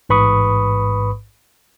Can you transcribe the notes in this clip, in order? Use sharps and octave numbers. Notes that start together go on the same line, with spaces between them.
A1 G#2 B4 B5 C#6 D#6